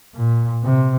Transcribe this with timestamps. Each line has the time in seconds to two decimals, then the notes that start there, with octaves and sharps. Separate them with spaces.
0.14 A#2
0.63 C3